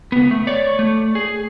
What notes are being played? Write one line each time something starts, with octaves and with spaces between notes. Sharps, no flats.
C#2 B3
A3
C#5 D5
A3
G#4